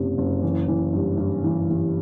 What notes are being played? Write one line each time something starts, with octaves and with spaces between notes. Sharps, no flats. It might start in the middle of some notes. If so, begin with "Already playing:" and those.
Already playing: F#1 E2 C3
F#1
E3
E3
G2
G2
E3
E3